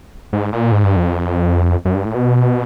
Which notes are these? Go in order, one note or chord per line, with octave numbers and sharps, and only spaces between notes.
G#2
A#2
G#2
G2
F2
F#2
G2
A2
B2